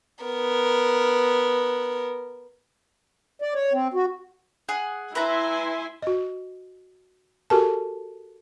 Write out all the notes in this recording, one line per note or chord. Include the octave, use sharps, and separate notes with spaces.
B3 A#4
D5
C#5
C4
F#4
G#4 F#5
E4 B4 E5 G#5 A#5 C6
F#4 D#5
F#4 G4 A4 A#4 G#5 A5